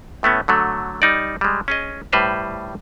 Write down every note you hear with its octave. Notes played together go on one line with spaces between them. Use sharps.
A2 A3 B3 C#4
D3 F#3 A3
G3 D#4 D5
G3 G#3
C#4 G#4 D#5
A2 G3 B4 C5 A#5